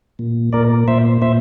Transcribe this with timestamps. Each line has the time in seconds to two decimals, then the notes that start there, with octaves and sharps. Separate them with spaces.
0.19 A#2
0.53 A#2 A#4 D5
0.88 A#2 C5 E5
1.22 A#2 C5 E5